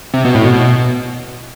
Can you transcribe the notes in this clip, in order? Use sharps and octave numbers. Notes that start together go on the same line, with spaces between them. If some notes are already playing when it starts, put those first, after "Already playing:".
C3
B2
A2
B2